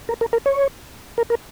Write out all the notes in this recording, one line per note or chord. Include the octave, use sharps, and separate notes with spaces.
A#4
A#4
A#4
C#5
A#4
A#4